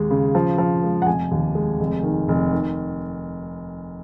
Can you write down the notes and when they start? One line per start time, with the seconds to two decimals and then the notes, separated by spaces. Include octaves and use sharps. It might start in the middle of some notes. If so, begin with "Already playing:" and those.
Already playing: D#2 G#3
0.11 C#3
0.35 F3
0.58 F3
0.84 G#3
1.02 F#5
1.06 F1 G#5
1.31 D#2
1.55 G#3
1.80 F1
2.03 D#3
2.28 F1
2.51 D#3